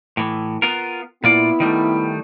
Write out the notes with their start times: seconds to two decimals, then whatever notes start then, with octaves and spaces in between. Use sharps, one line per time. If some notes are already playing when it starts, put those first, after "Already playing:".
0.17 A2 E3
0.62 B3 F4 A#4
1.24 A#2 B3 E4 F4 D5
1.60 D#3 G3 A3